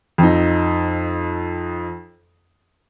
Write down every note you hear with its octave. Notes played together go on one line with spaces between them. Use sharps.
F2 D#4